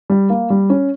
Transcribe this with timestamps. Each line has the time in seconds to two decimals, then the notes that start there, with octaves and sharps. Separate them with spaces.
0.10 G3
0.30 A#3
0.50 G3
0.70 C#4